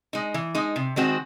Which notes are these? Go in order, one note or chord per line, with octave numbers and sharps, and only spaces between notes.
G#3 D#4
E3
G#3 D#4
C3
D#3 G#3 C4 F#4